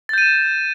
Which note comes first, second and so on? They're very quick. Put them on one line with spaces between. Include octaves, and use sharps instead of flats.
A6 G6 D#7 E7